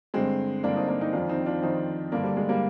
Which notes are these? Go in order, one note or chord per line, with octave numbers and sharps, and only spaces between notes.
G2 D3 G#3 C4
G2 D3 A#3 D4
C4 D#4
A#3 D4
C4 D#4
F2 D#3 D4 F4
C4 D#4
D4 F4
F2 D#3 C4 D#4
G2 D3 A#3 D4
G3
G#3
G3 A#3